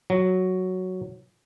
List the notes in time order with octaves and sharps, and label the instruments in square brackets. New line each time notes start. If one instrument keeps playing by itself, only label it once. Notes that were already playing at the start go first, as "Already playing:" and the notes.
[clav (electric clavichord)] F#3